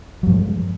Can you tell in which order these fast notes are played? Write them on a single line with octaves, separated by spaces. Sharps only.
F#3 G2 F3 G#3